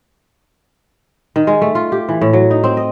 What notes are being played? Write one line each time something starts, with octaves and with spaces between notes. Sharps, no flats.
D#3
G#3
A3
F4
G4
E3
A2
F#3
D#4
C4
D#5